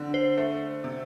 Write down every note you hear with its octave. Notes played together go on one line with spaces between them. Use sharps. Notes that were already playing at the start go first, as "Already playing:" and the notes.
Already playing: D3 C4
C5
A3
C3